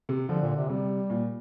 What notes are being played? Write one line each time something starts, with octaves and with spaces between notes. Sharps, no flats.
C3
D3 F3
A#2
C3
C3 G3
A#2